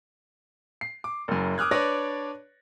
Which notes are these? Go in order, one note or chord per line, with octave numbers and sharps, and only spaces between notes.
C7
D6
F#1 F#2
D6 D#6 F6 F#6 G#6
D4 B4 C#5 D5 D6 A#6